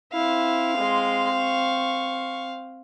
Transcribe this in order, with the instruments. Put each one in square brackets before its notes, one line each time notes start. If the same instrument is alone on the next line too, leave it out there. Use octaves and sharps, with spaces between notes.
[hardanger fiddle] C4 F5 [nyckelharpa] E4
[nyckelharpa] G#3 C6
C#6